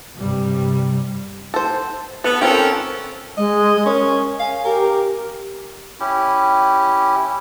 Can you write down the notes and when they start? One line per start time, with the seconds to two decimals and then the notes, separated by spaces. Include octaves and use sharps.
0.17 G2 C3 G3
1.54 A4 C5
2.24 B3 A4
2.42 C4 C#4 F4 A4 A#4 G5
3.37 G#3 D#5
3.86 C#4 A#4
4.40 F5 G#5
4.65 G4 A#4
6.00 C#4 E4 G4